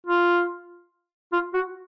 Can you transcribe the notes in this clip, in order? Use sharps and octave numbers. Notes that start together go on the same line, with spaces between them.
F4
F4
F#4